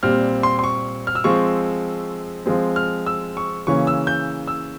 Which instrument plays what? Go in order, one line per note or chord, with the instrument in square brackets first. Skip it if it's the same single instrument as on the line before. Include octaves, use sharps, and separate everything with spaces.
[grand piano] A#2 G3 C4 F6
C6
C6
C#6
F6
E6
F3 G#3 C4 C#6
F3 G#3 C4
F6
E6
C#6
C#3 E3 A#3 C#4 C#6
E6
G6
E6